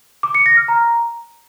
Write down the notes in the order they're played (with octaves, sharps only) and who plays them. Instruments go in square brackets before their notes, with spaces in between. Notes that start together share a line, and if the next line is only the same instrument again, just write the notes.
[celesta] D6
C#7
A#6
F6
A#5